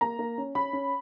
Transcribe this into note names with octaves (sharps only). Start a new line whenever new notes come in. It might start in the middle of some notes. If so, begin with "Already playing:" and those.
A#3 A#5
A#3
C#4
C#4 B5
C#4